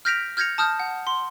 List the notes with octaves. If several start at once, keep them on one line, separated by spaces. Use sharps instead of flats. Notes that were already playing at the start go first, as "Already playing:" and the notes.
F6 G6 A#6 B6 D7 F7
F6 G6 G#6 A#6 C#7 F7
A5 D#6 F6 G6
F#5
C6